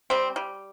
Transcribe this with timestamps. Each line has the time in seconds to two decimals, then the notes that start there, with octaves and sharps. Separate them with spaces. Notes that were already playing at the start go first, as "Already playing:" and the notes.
0.10 G3 C4
0.36 G3